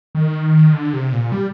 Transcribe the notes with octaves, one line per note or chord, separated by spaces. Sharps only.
D#3
D3
C3
A#2
G3